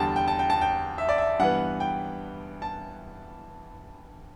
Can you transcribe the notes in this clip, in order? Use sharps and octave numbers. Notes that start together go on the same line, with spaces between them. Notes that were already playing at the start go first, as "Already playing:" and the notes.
Already playing: E2 D3 G3 G5 A5
G5
A5
G5
A5
G5
E5
D5
E5
G2 E3 B3 F#5
G5
A5